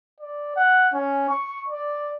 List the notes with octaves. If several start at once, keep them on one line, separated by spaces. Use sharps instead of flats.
D5
F#5
C#4
C#6
D5